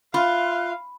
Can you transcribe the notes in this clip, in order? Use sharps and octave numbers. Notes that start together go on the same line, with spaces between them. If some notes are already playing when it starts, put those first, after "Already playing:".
F4 E5 F5 B5 C6 F#6